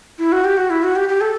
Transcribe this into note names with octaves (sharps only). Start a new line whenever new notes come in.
E4
F#4
G4
F#4
E4
F#4
G4
G4
A4